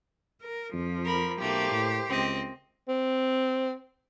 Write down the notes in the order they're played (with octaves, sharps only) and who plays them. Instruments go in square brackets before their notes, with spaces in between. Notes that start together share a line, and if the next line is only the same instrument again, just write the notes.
[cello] A#4
[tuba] F2 [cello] F3
[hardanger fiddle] A#4 B5
[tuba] B1 [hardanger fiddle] A3 A#3 [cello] G4 C5
[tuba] A2
[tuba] C#2 [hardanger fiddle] C4 D#5
[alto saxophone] C4